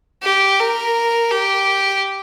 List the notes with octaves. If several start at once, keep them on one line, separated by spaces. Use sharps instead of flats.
G4
A#4
G4